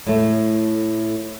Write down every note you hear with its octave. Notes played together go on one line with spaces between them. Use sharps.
A2 A3